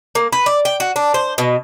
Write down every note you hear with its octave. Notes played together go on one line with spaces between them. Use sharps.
A#3
B4
D5
G5
F#4
D4
C5
B2